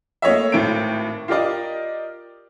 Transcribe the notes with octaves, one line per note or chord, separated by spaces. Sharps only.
A3 A#3 C#5 D#5 E5
G#1 A2 G5 D7
F4 G4 A#4 D5 D#5